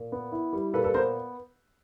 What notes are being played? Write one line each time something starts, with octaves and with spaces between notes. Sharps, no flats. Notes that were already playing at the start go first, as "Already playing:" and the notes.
Already playing: A#2
B3
E4
G3
A#2 A4 B4
A4 B4
B3 A#4 C5